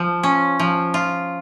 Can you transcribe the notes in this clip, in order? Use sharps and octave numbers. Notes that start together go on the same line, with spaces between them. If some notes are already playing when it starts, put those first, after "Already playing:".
Already playing: F3
C#4
F3
F4